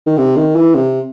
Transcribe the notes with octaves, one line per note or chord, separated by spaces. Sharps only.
D#3
C3
D#3
E3
C3